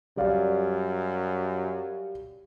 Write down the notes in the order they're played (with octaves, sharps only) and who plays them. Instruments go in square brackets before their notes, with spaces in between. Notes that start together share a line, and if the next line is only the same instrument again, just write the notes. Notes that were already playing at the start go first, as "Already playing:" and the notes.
[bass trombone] F#2 [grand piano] G3 D5 F5